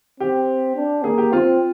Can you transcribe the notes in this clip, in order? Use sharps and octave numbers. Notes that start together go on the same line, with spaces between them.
C4 G4
D4
A#3 G#4
G4
C4 F4